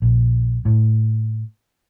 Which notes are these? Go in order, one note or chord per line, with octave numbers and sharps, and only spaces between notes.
A#1
A2